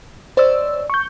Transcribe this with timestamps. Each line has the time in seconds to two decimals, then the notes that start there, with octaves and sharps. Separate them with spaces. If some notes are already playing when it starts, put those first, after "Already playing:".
0.37 C#4 D#4 C5 D5 E6
0.90 C#6 G6